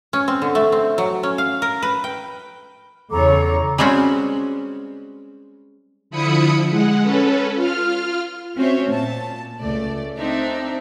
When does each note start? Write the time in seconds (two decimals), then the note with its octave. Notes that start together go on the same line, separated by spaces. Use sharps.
0.13 C#4
0.28 C4
0.42 D3
0.55 A3
0.72 C4
0.98 F#3
1.23 C#4
1.38 F5
1.62 A#4
1.82 B4
2.04 G5
3.11 E2 C#3 A4 C#5 A#5 D6
3.78 G3 G#3 C4 C#4 F#4
6.10 D3 F3 E4 B5 D#6 C#7
6.70 G#3 F#5
7.02 C#4 A4 B4
7.54 F4 F6
8.56 C4 C#4 F#4 C5 C#5 E5
8.89 A#2 A5
9.61 C#2 A3 D5
10.17 C4 D4 D#4 E5